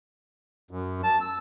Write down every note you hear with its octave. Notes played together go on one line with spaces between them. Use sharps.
F#2
A5
E6